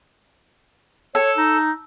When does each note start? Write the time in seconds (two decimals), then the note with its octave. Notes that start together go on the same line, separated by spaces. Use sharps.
1.15 A4 C#5
1.37 D#4